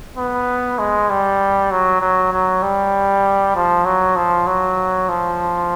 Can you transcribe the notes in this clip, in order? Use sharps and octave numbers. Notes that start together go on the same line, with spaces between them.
B3
G#3
G3
F#3
F#3
F#3
G3
F3
F#3
F3
F#3
F3